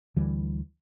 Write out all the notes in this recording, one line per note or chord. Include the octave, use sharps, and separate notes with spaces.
D2 D3 E3 G3